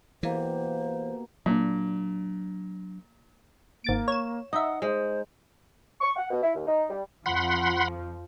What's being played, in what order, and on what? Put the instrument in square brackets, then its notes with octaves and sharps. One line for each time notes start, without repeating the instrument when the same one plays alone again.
[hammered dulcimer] B2 A#3 G4 [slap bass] E3 [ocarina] C5
[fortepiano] A#2 [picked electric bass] F#3 D4
[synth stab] G#1 A6 D7 [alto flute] A#3
[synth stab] C#5 E7
[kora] D#4 [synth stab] D#5 E5 [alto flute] F#5
[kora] G#3 [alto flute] C5
[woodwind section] C#6
F#5
B2
E4
D#2
D#4
G3
[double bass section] F2 F3 [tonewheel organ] F#5 B5 C6